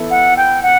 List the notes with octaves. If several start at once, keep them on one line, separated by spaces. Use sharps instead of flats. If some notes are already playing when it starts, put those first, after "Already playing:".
Already playing: E3 B3 E4 A4
F#5
G5
F#5